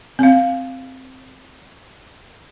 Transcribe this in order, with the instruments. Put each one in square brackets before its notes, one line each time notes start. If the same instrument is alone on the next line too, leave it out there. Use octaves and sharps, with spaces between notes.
[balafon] C4 F5